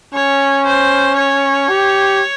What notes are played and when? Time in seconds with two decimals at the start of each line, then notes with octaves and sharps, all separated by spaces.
0.14 C#4 C#5
0.66 C5
1.17 C#5
1.69 G4